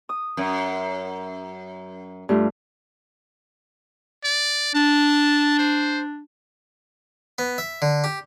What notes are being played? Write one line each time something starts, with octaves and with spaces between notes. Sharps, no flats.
D#6
F#2
G2 A3 F4
D5
D4 A5
C5
B3
E5
D3
G4